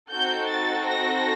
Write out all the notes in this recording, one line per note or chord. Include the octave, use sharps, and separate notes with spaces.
C4 D#4 F#4 A4 G6
A6
A#6